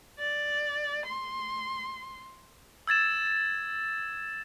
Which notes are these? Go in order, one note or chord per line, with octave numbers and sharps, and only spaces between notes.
D5
C6
E6 G#6 A6 E7